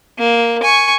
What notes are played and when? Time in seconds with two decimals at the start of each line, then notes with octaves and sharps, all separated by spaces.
0.18 A#3
0.63 G#5 C#6